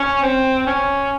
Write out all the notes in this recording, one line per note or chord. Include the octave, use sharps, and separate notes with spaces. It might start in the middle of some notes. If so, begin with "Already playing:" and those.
Already playing: C#4
C4
C#4